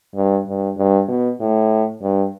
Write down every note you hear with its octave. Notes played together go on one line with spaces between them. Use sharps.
G2
G2
G2
B2
A2
G2